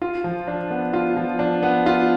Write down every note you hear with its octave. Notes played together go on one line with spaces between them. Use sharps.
F4
F3
D4
B3
F4
F3
D4
B3
F4